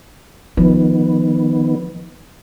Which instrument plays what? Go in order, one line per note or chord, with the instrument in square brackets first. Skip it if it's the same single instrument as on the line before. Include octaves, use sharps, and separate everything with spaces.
[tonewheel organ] D#3 B3 [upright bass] F3